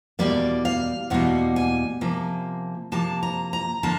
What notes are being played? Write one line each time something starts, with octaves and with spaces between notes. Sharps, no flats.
E2 B2 G3 A#3 D5
F5
E2 B2 G3 A#3 F#5
G#5
C3 F3 A#3
C3 F3 A#3 A5
A#5
A#5
D3 F3 A#3 A5